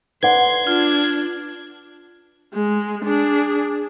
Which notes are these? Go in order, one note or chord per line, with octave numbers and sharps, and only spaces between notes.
B4 D5 F#5 C6 G#6
D4 F4
G#3
D4 G#4